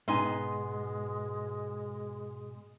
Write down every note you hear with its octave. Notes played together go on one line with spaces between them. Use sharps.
G#2 B2 G#3 B3 D#4 G#5 C6